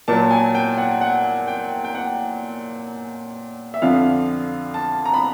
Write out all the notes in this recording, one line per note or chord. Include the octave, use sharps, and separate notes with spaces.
A#2 F#3 A5
G#5
G5
F#5
F#5
G5
G5
F#5
E5
F2 D3 F3 F5
A5
A#5
B5